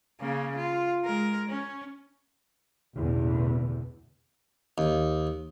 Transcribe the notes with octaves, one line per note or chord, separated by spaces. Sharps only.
C#3 A#3
F4
G#3 A#4
C#4
A1 E2 B2 D3
D#2